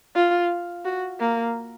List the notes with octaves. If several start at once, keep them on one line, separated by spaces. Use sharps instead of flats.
F4
F#4
A#3